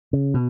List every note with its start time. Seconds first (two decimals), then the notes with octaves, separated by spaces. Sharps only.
0.13 C#3
0.34 B2